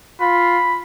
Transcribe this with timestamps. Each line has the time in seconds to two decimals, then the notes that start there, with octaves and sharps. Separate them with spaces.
0.21 F4 B5